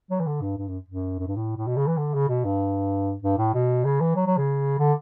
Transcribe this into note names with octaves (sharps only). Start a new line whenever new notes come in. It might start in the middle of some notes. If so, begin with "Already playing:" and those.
F#3
E3
D3
G2
G2
F#2
F#2
F#2
G2
A2
A2
B2
C#3
E3
D3
C#3
B2
G2
G2
A2
B2
C#3
E3
F#3
F#3
C#3
D3